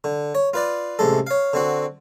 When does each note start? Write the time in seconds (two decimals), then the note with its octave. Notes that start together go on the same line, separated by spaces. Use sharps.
0.04 D3
0.35 C#5
0.54 F4 B4 D5
0.99 A1 C3 G#3 A4
1.27 C#5 F5
1.53 D3 C4 F#4